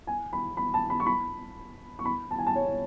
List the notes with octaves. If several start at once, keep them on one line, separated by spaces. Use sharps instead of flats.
G#5
B5
B5
A5
B5
C#6
B5
C#6
B5
A5
G#5
A5
C#5